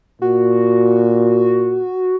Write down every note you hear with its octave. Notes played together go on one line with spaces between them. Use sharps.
A#2 F#4